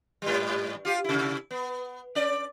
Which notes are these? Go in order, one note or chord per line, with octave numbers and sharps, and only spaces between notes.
G#2 G3
F4 G4
C3 E4
B3
C#4 D5